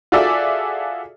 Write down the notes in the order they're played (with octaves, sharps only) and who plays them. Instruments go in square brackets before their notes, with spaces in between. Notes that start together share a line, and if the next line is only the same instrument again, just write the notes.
[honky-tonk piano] F4 F#4 G#4 A4 D5 E5